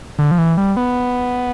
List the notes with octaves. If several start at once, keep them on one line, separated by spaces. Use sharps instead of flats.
D3
F3
E3
G3
B3